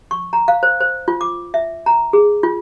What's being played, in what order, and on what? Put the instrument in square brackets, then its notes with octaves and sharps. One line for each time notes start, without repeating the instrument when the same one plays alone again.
[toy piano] C#6
A#5
F5
C5
C5
F4
D6
E5
A#5
G#4
F4